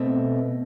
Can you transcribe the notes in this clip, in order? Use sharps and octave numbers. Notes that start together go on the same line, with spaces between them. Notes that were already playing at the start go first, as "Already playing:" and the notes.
Already playing: B2 A3 C4